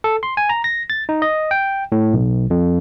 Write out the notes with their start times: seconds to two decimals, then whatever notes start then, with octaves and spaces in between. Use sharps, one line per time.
0.04 A4
0.23 C6
0.37 G#5
0.49 A#5
0.64 A#6
0.90 A6
1.09 D#4
1.22 D#5
1.51 G5
1.92 A2
2.13 B1
2.50 F2